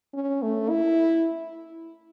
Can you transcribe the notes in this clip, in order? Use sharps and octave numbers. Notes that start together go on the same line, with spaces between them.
C#4
A3
E4